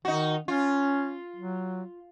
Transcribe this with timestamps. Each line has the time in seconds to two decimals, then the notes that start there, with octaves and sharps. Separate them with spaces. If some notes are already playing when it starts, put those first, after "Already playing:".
0.05 D#3 D#4 F#4
0.48 C#4 F4
1.36 F#3